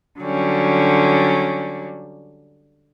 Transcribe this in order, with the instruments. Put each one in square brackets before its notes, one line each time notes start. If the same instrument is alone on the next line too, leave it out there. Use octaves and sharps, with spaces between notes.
[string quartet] D3 F#3 G3 C#4